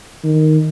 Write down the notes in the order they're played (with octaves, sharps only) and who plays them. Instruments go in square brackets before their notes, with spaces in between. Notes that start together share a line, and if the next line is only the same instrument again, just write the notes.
[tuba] D#3